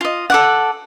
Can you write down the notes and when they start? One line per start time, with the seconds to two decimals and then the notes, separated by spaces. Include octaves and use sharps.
0.01 F4 D#5
0.30 A4 D5 F#5